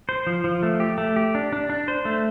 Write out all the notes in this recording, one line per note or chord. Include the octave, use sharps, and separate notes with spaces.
C5
F3
F3
A3
G4
A3
G4
D4
D4
D4
C5
A3